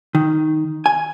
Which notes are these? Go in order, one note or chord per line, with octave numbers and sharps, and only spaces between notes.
D#3
G#5